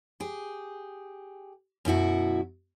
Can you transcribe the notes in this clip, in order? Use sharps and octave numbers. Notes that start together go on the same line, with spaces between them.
G4 G#4
F#2 B2 E4 F#4